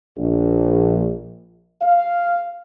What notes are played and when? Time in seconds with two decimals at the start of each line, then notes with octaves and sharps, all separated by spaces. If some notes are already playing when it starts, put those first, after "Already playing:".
0.18 A#1
1.82 F5